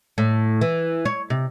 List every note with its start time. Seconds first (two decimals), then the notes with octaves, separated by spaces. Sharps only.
0.18 A2
0.61 E3
1.05 C#5
1.30 C3